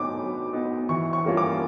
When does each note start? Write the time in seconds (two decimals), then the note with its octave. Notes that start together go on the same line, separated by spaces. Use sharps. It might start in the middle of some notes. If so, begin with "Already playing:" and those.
Already playing: F#3 B3 D#4 D6
0.17 F#3
0.53 B3 D#4
0.89 E3 C#6
1.13 C#6
1.25 G3 A#3 C#4 F4
1.37 D6